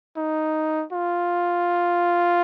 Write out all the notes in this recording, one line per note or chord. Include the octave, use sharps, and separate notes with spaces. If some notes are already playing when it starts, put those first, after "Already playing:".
D#4
F4